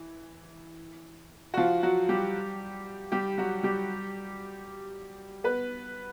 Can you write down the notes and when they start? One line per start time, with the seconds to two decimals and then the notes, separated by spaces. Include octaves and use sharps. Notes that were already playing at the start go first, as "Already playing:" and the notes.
Already playing: E3
1.54 F#4
1.57 F3 F4
1.83 F#3 F#4
2.09 G3 G4
3.12 G3 G4
3.38 F#3 F#4
3.63 G3 G4
5.44 B3 B4